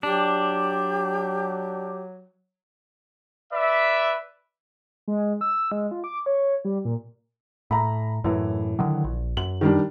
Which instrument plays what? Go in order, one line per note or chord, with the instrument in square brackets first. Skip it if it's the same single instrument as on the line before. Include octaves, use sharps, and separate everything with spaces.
[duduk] F#3 [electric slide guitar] D4 [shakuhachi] G4
[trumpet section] B4 D5 E5
[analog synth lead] G#3
E6
G#3
F4
D6
C#5
G3
A#2
[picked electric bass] A2 [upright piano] A#5 B5
[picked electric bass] F#2 A2 [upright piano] E3
[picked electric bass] D3 D#3 F#3
A#1
[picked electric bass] F#2 [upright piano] F#7
[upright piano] D#3 G3 D4